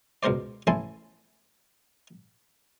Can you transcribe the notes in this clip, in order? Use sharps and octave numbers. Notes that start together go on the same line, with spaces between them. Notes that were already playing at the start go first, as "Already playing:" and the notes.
C#2 B2 A#4 C5 D5
A1 A2 E4 G#5 A5 C6